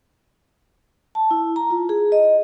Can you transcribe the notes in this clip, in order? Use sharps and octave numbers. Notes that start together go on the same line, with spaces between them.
A5
E4
A#5
F4
G#4
D#5